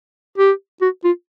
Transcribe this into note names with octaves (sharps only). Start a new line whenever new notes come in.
G4
F#4
F4